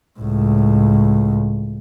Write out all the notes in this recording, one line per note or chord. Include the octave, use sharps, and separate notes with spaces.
C#2 A2